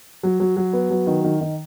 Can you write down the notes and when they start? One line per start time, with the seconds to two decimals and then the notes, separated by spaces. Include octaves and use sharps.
0.23 F#3
0.40 F#3
0.57 F#3
0.73 B3
0.90 F#3
1.07 D#3
1.24 D#3
1.41 D#3